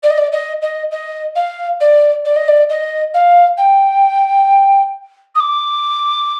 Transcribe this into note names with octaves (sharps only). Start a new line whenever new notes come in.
D5
D#5
D5
D#5
D#5
D#5
F5
D5
D5
D#5
D5
D#5
F5
G5
D#6
D6